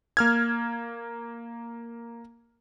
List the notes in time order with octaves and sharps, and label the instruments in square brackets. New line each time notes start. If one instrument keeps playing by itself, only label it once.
[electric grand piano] A#3 F6 G#6